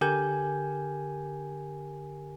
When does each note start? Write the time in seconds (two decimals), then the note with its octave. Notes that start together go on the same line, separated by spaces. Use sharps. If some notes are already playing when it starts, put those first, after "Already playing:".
0.01 D3 G4 A#4 G#5 G6